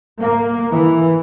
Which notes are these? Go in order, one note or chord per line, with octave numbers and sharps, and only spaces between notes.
A#3
E3